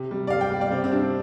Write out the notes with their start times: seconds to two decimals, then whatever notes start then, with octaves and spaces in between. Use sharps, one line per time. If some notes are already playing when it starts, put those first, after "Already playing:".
Already playing: C3
0.11 G3
0.27 D5
0.30 G3 F5
0.41 G5
0.51 G3
0.61 D5
0.71 C3 C4
0.84 C4
0.92 G3 D4